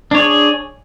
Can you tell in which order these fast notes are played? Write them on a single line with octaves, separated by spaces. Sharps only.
D4 C#5 G#4